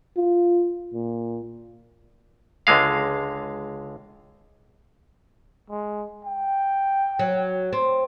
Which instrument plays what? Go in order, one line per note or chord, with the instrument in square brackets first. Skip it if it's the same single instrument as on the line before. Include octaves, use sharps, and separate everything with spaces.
[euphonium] F4
A#2
[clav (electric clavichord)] C#2 D3 G#3 F5
[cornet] G#3
G5
[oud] F#3
C4